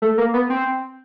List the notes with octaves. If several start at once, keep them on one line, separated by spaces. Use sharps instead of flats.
A3
A#3
B3
C4